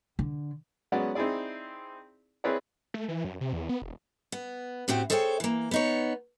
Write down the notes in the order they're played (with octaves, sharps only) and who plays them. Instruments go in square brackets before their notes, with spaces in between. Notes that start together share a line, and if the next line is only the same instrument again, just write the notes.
[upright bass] D3
[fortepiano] F#3 G#3 B3 C#4 D5 F#5
C4 D#4 E4 G#4 D5
C4 E4 G#4 B4 C#5 D5
[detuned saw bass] A3
E3
F#2
C3
E2
B3
E1
[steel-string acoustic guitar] B3
A2 C4 F#4 G4
G#4 A4 C5 C#5 F5 G5
E3 A#3
B3 D#4 C#5